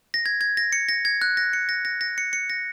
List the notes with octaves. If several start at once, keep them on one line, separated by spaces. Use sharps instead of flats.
A#6
G#6
G#6
A#6
C#7
A#6
G#6
F#6
A#6
C#7
A#6
A#6
A#6
C#7
C#7
A#6